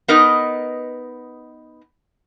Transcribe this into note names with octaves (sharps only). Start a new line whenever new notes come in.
B3 D#4 A#4 B4 D#5